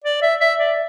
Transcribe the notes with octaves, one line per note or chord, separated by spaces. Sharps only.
D5
E5
E5
D5